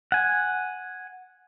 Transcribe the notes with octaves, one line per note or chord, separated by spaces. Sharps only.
F#5 G#5